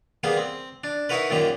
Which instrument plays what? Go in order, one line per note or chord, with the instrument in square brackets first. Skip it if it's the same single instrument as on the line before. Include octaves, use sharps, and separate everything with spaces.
[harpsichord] G3 A#3 B3 G#4
C4
D4
D#4 E4 F#4 A#4 B4
F#2 A#2 D#3 A#3 G4